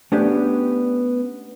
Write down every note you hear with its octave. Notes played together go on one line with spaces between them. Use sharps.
A3 B3 C#4 D4 G4